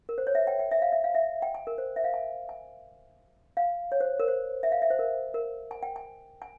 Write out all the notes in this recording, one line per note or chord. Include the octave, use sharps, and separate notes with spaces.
A#4
C5
C#5
E5
G5
G5
E5
F5
E5
F5
E5
G5
G#5
A#4
C5
E5
F5
G#5
G#5
F5
C#5
C5
A#4
C5
E5
F5
E5
C5
A#4
A#4
G#5
G5
G#5
G#5